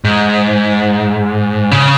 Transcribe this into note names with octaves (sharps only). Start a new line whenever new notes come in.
G#2
C#3